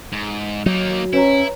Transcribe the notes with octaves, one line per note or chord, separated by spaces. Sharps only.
G#2
F#3 A#3 D#4
C#4 E4 B4 C#5 A#5